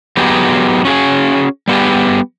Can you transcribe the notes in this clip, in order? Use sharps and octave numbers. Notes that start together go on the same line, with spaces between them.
F#3 B3 D#4 G4 G#4
C#4 F#4 G#4
G3 B3 G4 G#4